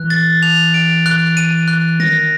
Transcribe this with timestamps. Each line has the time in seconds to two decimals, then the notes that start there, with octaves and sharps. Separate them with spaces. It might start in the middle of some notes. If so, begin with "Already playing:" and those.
Already playing: E3 F#6
0.10 A6
0.43 F7
0.74 D7
1.06 F#6
1.37 D#7
1.68 F#6
2.00 D#3 A#6